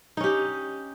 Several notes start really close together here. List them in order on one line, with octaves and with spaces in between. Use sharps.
D#4 C#4 G4